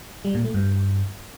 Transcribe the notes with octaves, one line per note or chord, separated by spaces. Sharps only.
G3
A#2
A3
G2